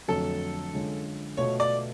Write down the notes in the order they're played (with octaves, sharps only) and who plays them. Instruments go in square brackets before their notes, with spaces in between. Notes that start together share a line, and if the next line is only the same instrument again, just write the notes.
[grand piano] F2 D3 F#3 A3 [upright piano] A4
[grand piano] D3 G#3 C#4 F4
[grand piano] B2 A3 F4 [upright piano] C#5
[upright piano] D5